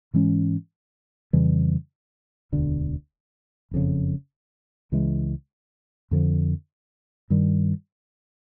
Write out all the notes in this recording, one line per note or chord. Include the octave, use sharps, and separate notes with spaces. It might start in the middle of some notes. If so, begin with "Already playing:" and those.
G#2 E3 G#3 C#4
F2 C#3 E3 G3
E1 D2 D3
F#1 F2 C#3
C#2 C#3 E3 G#3
F2 D3 F3
G2 D#3 G3